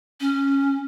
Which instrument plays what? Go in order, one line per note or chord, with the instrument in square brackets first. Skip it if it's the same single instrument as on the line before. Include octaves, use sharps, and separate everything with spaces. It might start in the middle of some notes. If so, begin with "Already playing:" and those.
[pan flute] C#4